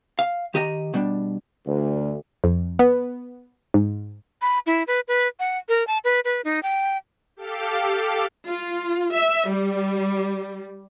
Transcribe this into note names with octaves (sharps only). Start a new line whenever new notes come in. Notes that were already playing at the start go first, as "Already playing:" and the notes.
F5
D#3 G4 D#5 F5 A#5
B2 G3 D4
D2
F2
B3
G#2
B5
E4
B4
B4
F#5
A#4
A5
B4
B4
D#4
G5
G4 A4 F5 D6
F4
E5
G3